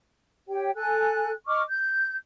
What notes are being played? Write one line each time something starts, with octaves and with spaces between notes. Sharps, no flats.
G4 C#5 G5
A4 G#5 F#6
D#5 C#6 D6 F6
G6